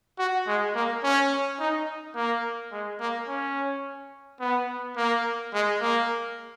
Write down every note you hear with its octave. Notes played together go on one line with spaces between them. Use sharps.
F#4
G#3
A#3
C#4
D#4
A#3
G#3
A#3
C#4
B3
A#3
G#3
A#3